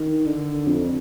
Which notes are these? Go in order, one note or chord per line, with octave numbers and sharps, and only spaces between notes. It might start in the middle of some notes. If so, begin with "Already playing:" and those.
Already playing: D#3
D3
F2